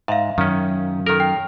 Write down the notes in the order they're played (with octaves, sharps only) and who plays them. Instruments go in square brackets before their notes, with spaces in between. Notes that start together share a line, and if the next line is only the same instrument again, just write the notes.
[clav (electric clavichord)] G#2 [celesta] E5 F5
[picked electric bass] F#2 [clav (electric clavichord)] D#3 C#4
[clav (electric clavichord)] D#3 A#4 [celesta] A4 F6
[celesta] G5